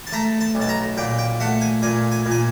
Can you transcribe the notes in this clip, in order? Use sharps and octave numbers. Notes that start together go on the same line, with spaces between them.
A5
A3 A#5
A5
B1
A5
A#5
A#2 G5
G5
A3 F#5
G#5
A#2 G#5
G#5
A#2
G#5